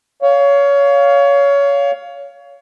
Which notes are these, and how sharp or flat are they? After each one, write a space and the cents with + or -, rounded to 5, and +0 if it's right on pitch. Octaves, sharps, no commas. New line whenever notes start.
C#5 +25 F5 +0